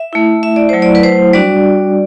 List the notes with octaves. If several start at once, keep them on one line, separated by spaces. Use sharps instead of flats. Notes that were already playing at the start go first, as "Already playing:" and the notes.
Already playing: E5
A3 E4
E5
D5
F#3 A3 E4 C5
D5
B4
C5
G3 D4 F#4 D5